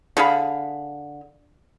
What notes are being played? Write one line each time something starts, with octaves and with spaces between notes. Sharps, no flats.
D3 G#4 F5 B5